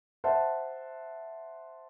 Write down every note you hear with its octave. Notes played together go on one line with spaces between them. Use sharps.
C5 E5 F#5 A5